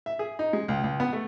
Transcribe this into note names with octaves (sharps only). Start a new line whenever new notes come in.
E5
G#4
D#4
G#3
C#2
C#2
B3
A3